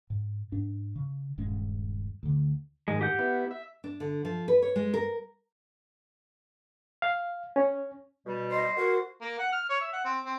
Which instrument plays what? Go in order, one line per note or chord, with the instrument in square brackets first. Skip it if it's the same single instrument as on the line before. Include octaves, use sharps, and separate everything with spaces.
[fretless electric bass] G#2
G#2 D4
C#3
D#1 G2 G#3 C#4
D2 D3
[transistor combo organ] G#2 D#3 [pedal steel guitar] G#3
[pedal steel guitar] G4 F#5 G6
[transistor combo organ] B3 E4
E5
[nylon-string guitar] D4
D3
F3
B4
C#5
G#3
A#4
[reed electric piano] F5
C#4
[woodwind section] B2 G3
[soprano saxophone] C5 [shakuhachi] D#5
[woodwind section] F#4 [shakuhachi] A#4
[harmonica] A#3
F#5
F6
C#5
E5
F#5
C4
C4